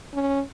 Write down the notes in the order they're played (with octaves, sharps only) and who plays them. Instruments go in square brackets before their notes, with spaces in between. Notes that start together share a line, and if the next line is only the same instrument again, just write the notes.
[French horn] C#4